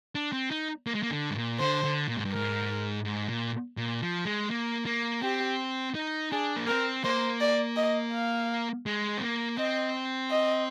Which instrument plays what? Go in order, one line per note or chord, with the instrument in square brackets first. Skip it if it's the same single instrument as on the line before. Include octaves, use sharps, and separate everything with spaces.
[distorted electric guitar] D4
C4
D#4
A#3
G#3
A#3
D3
G#2
A#2
[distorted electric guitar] D3 [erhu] C5
[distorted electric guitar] D3
A#2
G#2
G2
[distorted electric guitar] G#2 [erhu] A#4
[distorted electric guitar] G#2
A#2
A#2
F3
G#3
A#3
A#3
[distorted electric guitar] C4 [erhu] G4
[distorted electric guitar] D#4
[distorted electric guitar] D4 [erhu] G#4
[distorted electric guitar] A#3
[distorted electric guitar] C4 [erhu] A#4
[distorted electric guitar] A#3 [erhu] C5
[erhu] D5
D#5
F5
[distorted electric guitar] G#3
C4
A#3
[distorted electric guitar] C4 [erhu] D#5
[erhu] D#5